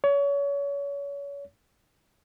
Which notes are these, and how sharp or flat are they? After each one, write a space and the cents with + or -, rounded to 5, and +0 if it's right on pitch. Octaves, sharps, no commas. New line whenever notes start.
C#5 +30